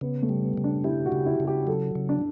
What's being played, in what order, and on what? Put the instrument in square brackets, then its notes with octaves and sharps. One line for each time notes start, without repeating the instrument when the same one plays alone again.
[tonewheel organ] C#3 [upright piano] B3
[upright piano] A3
[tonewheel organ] G3
[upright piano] B3
[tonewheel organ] C#3
[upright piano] D4
[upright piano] E4 [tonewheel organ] G4
[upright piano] F#4
[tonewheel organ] C#3
[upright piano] E4
[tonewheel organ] C#3
[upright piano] G4
[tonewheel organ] F#3 [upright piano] A4
[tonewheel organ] C#3
[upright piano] D4